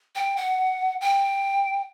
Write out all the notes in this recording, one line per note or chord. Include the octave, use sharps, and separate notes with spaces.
G5
F#5
G5